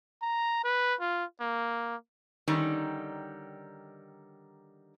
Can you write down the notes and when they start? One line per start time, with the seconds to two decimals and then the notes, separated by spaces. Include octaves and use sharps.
0.22 A#5
0.64 B4
1.00 F4
1.41 A#3
2.48 D3 D#3 G3 C#4 D#4